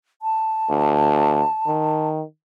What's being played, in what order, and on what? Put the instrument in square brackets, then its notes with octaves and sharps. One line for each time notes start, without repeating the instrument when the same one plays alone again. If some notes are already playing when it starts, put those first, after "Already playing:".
[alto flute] A5
[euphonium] D2
D#3